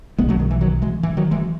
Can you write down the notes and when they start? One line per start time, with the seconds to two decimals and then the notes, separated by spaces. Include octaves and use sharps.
0.18 B1 B2 G#3 B3
0.29 F#3 A3
0.40 D#3
0.51 E3
0.61 D#3 F#3
0.82 E3 G#3
1.03 E3
1.17 D#3 F#3
1.31 E3 G#3